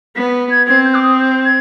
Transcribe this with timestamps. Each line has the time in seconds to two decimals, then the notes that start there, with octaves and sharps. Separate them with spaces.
0.16 B3 B6
0.51 G#6
0.68 C4 G#6
0.85 G6
0.94 D6
1.02 D#6
1.19 G6
1.45 G#6